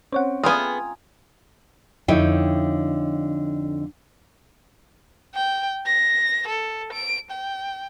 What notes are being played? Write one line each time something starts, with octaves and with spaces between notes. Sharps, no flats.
C4 C#4 C5 C#5 F#5
B3 F4 G#4 F5 G5 G#5 A#5 D#6
F2 D3 D#4 E4 C#5 G5
G5
A#6
A4
D7
G5